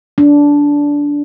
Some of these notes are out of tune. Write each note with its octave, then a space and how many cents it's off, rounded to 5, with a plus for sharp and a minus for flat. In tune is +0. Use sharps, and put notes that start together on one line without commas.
D4 -15